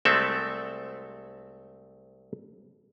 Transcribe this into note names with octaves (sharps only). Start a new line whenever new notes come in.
C2 G#3 A3 C4 A4 E5